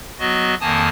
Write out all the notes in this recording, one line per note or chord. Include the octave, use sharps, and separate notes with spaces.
F#3 B3 F#4 D#5
F2 D#3 A#3 G#5 A5 D#6